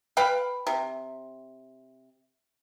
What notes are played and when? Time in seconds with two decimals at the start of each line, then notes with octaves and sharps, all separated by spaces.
0.17 B4 F5 G5 B5
0.67 C3